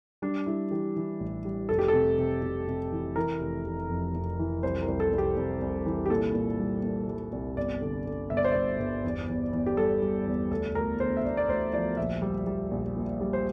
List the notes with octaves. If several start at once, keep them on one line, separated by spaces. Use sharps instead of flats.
G3 D4
G3 E4
E3 G4
E3
A1
G3
F1 A4
G4
A4
C3
C3
C3
C3
E3
E3 A#4
F1
F1
F2
F2
E3
C2 C5
A#4
C2
A4
C2
G4
C2
C2
E3
G4
A#2 A4
A#2
G3
A#2
G3
C2
G1 D5
D3
D3
G1 E5
D5
C5
G1 D5
G1
E2
E2
E2
G4
G3 A4
G3
E2
D2 A4
D2 A#4
D3 C5
E5
D2 D5
D5
D2 C5
F3 D5
A#1 E5
G3
G3
A#1
A#2
G3
C5